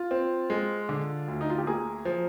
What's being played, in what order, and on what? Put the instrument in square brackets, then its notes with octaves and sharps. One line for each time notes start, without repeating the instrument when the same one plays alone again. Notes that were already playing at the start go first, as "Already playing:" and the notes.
Already playing: [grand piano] F4
C4
G#3
D3
D2
D#4
F4
G4
A#3 G#4
F3